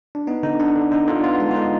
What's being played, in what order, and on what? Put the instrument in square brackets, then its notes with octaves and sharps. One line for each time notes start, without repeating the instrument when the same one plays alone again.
[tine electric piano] D4
B3 D#4
D3 D#4
D3 D4
D3
D3 D#4
D3 F4
B3 F4
G#3 D4
F4
D3 D#4